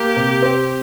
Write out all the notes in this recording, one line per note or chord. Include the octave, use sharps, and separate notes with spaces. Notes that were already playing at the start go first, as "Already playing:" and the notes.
Already playing: A#3 G4
C3
C4